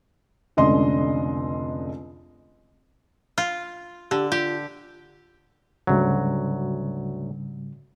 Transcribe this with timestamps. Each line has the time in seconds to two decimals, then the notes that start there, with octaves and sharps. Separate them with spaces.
0.57 F1 C#2 D3 D#5 C6
3.38 F4
4.11 D3 G4
4.32 F4 G4
5.87 D2 G#2 C#3 F#3 G3